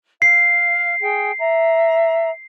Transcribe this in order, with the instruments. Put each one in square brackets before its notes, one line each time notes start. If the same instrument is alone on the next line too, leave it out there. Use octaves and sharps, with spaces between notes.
[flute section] F5 [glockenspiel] C7
[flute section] G#4 G5
E5 A#5